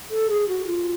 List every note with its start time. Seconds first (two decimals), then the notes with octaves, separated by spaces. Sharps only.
0.11 A4
0.30 G#4
0.48 F#4
0.67 F4